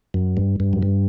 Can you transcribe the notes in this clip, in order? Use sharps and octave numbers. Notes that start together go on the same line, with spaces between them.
F#2
G2
G2
F#2
G2